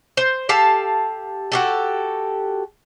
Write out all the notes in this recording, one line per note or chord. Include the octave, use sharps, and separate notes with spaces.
C5
G4 A4 F5 A5
F#4 G4 A4